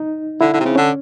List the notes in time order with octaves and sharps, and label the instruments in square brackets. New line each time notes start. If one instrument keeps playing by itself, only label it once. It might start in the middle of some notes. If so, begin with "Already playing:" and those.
Already playing: [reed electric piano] D#4
[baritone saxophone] D3 [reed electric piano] E4
[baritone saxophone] D3
C3
[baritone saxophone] C#3 [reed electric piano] C4
[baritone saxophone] D3 [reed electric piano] C#4